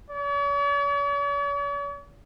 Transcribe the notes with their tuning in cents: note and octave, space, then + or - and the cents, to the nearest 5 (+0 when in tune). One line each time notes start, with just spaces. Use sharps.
C#5 +45